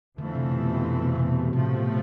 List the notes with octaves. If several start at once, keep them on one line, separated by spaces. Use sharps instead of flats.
F2 D3 E3 A3 C4
C3
B2
B2
C3
B2
C3
A2 C3 F3 A3